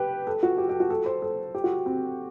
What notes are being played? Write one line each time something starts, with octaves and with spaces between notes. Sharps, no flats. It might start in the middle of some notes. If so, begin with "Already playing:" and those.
Already playing: G4 B4
A4
F#4
G4
G4
F#4
A4
C5
A4
G4
F#4
C4